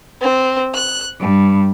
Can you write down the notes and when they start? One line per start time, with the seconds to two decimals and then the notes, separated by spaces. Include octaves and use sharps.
0.21 C4
0.74 F#6
1.19 G2